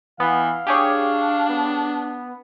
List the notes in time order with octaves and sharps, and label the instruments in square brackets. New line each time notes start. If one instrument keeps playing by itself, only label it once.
[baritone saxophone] E3 [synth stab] B3 [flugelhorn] F5
[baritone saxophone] D4 [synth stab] G4 G#4 C#5
[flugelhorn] B3